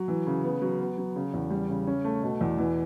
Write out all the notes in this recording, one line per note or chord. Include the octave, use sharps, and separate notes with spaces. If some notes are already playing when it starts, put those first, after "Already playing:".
Already playing: F#3
E3
C#3
B3
F#3
B3
F#3
C#3
E2
G3
C#3
C#4
A3
B2
E2
E3